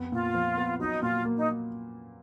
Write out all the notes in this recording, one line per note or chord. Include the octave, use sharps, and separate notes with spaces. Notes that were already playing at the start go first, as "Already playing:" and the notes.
Already playing: F2 B3
A#2 F4
F3
B3
F#3 D#4
A#2 F4
A#3
D#4